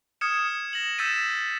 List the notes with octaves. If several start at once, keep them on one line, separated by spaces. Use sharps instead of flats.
D#6 F6 G#6 C#7 E7
A#6 E7 F#7
E6 G6 A6 B6 D#7 E7